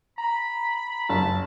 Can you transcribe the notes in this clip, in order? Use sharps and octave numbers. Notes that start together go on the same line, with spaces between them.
A#5 B5
F#1 A5